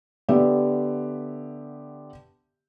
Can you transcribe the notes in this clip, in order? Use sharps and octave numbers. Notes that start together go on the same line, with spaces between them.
D3 B3 G4 E5